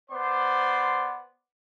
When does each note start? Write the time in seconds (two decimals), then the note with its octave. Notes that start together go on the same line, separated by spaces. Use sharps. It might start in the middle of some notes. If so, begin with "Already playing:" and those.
0.11 B3 C5 D5 C6